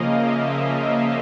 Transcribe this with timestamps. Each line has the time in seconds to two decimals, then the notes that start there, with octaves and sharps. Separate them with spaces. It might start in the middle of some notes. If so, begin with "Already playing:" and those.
Already playing: C#3 F3 A#3 D#5 F5
0.13 E5